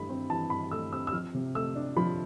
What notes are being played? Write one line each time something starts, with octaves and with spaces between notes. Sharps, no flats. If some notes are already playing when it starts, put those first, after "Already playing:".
Already playing: G2 E3 A3 B5
C4
E3 A5
G2 B5
A3 E6
C4 E6
E6
F3 F6
C3
A3 E6
D4
F3 B5